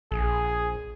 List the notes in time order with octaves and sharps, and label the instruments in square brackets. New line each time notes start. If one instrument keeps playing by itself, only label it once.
[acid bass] A#1 [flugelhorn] G#4